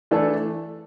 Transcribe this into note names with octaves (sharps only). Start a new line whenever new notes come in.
E3 A3 D4 A4